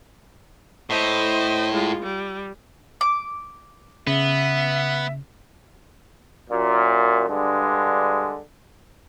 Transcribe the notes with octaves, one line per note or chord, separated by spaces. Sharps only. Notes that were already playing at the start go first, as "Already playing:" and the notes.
A2 C5 D#5
G#3 F4
G3
D6
C#3 B3 E5
F#2 A#2
G2 D3 G#3